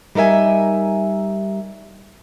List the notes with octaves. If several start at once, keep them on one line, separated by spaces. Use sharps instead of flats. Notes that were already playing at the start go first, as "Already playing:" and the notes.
G3 D#4 A#4 E5 G#5